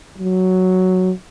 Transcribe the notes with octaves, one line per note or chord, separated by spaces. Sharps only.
F#3